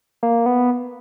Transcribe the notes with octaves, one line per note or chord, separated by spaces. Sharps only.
A#3
B3